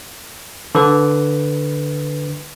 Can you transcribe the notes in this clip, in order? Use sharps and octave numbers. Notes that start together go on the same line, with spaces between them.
D3 B4